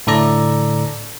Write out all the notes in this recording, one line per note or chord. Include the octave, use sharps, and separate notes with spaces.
A2 D3 A4 D5 A#5